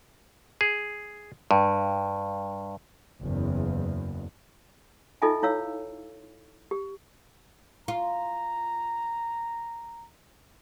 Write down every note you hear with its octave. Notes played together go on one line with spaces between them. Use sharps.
G#4
G2
F#1 E2
D#4 F4 A4 D#5 E5 G#5
E4 C#5 F5 E6
G4
F4 A#5